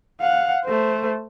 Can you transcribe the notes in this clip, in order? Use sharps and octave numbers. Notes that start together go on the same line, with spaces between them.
F5 F#5
A3 C5